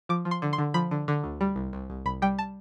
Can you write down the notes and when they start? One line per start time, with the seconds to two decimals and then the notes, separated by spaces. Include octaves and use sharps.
0.09 F3 D6
0.25 F3
0.31 C6
0.42 D3
0.53 C6
0.58 D3
0.74 F3 B5
0.91 D3
1.08 D3
1.24 D2
1.41 G3
1.56 C2
1.73 C2
1.90 C2
2.06 C2 B5
2.22 G3 G5
2.39 A5